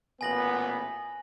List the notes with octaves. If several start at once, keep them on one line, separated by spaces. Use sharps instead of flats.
A1 A#2 B3 G#5 A#6 F#7